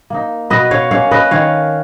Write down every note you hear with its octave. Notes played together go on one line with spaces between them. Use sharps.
A#3 D#4
B2 B4 D#5
C#5 F5
A#3 C#4 C#5 F5
B4 D#5
D#3 C#5 F5